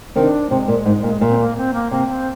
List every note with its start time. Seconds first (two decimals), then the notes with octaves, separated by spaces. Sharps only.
0.16 C3 D#3 D4
0.51 C3 G#3
0.68 A#2
0.86 G#2
1.03 A#2
1.21 A#2
1.29 C4
1.39 A#3
1.57 C4
1.73 A#3
1.91 C3 A#3
2.09 C4